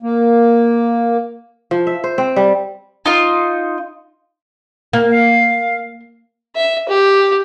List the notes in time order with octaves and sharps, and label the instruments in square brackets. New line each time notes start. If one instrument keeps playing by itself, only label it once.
[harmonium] A#3
[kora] F3
E5
C5
C4
G3
[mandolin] D#4 F4
[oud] A#3
[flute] F5
[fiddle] E5
G4